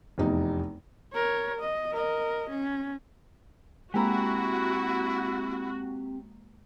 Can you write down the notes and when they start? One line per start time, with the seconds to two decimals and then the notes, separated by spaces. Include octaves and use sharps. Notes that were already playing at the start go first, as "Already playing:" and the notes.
0.18 F1 E2 D#4
1.13 A#4 C#5
1.60 D#5
1.92 A#4 D#5
2.49 C#4
3.94 G#3 A#3 C4 E4 F#4 G4 A#5